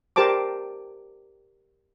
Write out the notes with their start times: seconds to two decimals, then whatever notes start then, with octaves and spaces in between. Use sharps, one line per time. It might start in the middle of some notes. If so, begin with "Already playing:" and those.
0.16 G4 A#4 C5 A5 D6